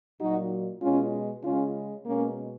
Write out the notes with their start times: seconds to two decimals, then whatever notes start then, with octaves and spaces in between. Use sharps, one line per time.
0.19 A#2 F#3 D#4 F#4
0.81 B2 G#3 C#4 F4
1.43 C#3 G#3 C#4 F4
2.05 B2 G#3 A#3 C#4